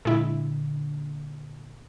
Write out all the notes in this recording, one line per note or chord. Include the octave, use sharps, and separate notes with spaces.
A#2 D3 G#3 E4